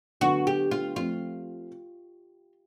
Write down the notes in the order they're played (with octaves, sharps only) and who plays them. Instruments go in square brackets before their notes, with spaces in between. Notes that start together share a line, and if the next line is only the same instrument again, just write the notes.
[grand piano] D3 F#3 B3 [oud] F#4
[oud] G4
F4
[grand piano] F3 A3 C4 [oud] F4